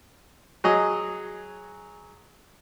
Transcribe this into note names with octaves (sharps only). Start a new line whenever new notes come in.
F#3 G#4 D#5